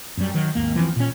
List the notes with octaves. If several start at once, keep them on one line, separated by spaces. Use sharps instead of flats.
F#2 G3
D#3 F#3
G#1 D#2 A#3
E3 F3 A3 C4
A#2 C#4